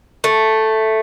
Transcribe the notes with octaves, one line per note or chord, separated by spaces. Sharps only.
A3